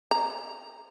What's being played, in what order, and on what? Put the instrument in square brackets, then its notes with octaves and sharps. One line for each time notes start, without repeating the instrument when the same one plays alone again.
[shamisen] A#5